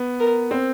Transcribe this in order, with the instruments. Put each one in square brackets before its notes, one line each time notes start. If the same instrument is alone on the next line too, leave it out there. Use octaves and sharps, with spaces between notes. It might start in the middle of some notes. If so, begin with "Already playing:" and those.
Already playing: [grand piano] B3
[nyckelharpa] A#4
[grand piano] C4